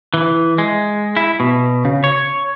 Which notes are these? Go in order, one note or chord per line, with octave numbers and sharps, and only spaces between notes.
E3
G#3
E4
B2
C#3
C#5